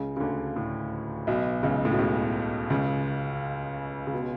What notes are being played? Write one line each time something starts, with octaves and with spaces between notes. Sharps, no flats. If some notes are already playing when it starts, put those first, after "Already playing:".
Already playing: C#2 C#3
C#3
D2 D3
A2
B1 B2
C#2 C#3
A2
B2
C#2 C#3
C#2 C#3
C#3
B2